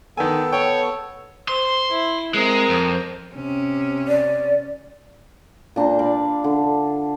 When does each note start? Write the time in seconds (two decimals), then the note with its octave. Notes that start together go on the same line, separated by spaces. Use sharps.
0.17 D#3 B3 A4 G#5
0.53 C#5 G5
1.48 C5 C6
1.91 E4
2.34 G#3 C4 A#4
2.69 F2
3.34 C3 C#4
4.08 D5
5.76 A#2 D4 C5 A#5
5.99 D5 F5 B5
6.44 D3